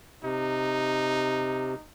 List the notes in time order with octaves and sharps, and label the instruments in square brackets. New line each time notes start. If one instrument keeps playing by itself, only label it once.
[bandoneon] C3 [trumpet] D#4